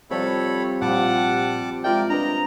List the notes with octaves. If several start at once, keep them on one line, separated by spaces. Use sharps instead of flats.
C3 F3 G3 A4 C#5 B5
A#2 F3 G3 F#5 A5 D6
G#3 F4 A#4 D5 E5 G5
D4 A#4 B4 D#5 A#5